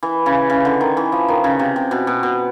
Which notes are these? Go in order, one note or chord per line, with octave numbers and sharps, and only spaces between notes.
E3
C#3
C#3
D3
D#3
E3
F3
D#3
C#3
C3
C3
B2
B2
B2